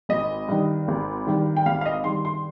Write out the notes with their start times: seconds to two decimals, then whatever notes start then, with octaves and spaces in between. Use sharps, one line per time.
0.09 G#1 D#5
0.48 G2 D#3
0.88 G#1
1.27 G2 D#3
1.57 G5
1.66 G#1 F5
1.81 F5
1.86 D#5
2.04 G2 D#3 C6
2.25 C6